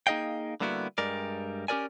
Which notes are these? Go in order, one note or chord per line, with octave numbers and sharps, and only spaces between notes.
A#3 D#4 G#4 D#5 F5 G5
D3 G3 A#3 B3 E4 F#4
G2 G3 G#3 A#4 D5
C#4 G4 G#4 A#4 D5 G#5